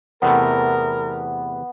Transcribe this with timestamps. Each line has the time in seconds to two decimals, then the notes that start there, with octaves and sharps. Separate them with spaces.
0.22 E2 C3 A3 B3 A#4